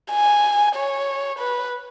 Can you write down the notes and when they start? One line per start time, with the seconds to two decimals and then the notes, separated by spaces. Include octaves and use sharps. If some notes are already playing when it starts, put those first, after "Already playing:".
0.12 G#5
0.76 C#5
1.39 B4